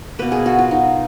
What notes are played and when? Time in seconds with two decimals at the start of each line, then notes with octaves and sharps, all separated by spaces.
0.19 B2 A#3 B4
0.32 G#4
0.46 F#4
0.59 F4
0.71 D#4